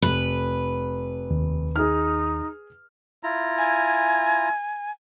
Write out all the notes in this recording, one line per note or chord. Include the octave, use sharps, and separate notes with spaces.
F1 B4
D#2
D#4 G#4 F6
E4 F4 A#5
G#5